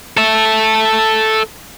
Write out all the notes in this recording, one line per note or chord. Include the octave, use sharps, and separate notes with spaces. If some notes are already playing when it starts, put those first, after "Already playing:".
A4 E5